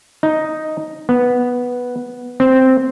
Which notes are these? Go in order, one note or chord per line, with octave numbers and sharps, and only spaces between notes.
D#4
B3
C4